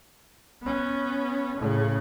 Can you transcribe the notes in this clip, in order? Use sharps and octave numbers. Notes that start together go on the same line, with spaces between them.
B3 C#4
A2 C#3